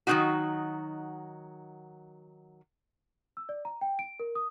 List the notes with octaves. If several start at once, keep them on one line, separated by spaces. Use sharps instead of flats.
D#3 F#3 G#3 C4 D#4 F#4
E6
D5
A#5
G5
D7
A#4
D#6